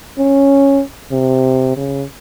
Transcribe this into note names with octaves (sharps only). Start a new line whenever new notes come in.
C#4
C3
C#3